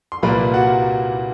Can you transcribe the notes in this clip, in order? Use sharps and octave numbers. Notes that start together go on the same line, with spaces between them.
C6
C2 A#2 G3 A#3 B4 B5
F#4 F#5